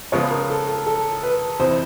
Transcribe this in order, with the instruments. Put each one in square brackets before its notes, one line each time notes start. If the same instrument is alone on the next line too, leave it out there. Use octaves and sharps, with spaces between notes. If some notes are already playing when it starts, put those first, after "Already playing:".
[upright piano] C#3 F3 G#3 B3 [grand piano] C#5
[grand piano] A#4
A4
A4
A4
B4
[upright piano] F2 C3 E3 [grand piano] C5